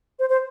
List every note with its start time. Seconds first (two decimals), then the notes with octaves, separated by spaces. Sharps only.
0.19 C5
0.30 C5